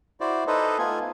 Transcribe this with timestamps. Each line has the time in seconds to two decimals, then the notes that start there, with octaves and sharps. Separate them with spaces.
0.20 E4 F#4 C5 D5
0.47 D#4 A4 B4 C5 D#5
0.78 A3 B3 F4 G#5